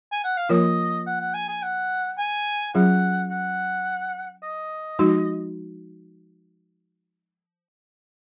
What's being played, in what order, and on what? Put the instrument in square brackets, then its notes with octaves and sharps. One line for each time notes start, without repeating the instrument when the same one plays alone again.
[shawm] G#5
F#5
F5
[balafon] F3 A#3 F4 A#4 C#5 [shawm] D#5
[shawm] F#5
F#5
G#5
G#5
F#5
G#5
[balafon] F#3 C#4 F4 G#4 C#5 [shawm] F#5
[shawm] F#5
D#5
[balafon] F3 G#3 D#4 F#4